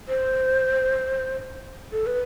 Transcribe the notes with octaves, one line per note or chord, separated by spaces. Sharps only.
C5
A4
B4